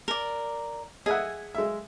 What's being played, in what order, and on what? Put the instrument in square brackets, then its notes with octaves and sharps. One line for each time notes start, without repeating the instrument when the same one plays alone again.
[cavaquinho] A#4 D5
[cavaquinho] G#4 G#5 [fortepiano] D#5 E5 F#5
[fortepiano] G#3 E5